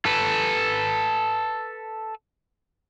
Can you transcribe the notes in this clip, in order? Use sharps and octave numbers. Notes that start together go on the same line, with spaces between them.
A4 B4